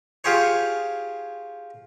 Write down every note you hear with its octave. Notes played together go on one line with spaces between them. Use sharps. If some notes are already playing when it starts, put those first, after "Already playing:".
F4 G4 G#4 C5 C#5